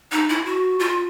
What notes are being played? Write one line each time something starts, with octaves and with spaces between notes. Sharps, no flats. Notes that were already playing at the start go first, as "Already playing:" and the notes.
D#4
E4
F#4
F4